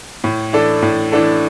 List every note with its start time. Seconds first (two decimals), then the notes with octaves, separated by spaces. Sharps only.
0.24 A2
0.53 E3 D4 A4
0.82 A2
1.12 E3 D4 A4